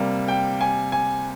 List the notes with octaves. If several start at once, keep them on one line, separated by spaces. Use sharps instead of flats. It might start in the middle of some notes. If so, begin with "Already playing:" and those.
Already playing: C3 G3 A#3
G5
G#5
G#5